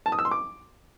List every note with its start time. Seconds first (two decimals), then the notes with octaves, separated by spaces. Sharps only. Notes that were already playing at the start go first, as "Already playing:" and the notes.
0.06 A5
0.12 D#6
0.19 E6
0.25 C6
0.31 D6